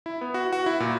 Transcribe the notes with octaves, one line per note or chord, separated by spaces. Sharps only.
E4
B3
F#4
F#4
E4
A#2